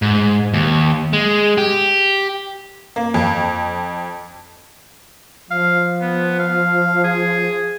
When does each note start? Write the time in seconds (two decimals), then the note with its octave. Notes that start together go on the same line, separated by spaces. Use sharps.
0.02 G#2
0.53 D#2
1.13 G#3
1.58 G4
2.96 A#3
3.14 F2
5.51 F3 F5
6.01 B3
6.39 F5
7.04 G#4